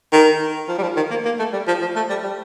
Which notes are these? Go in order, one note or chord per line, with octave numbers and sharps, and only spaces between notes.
D#3
F3
G3
F3
D#3
A#3
A#3
A3
G3
F3
F3
A3
G3
G3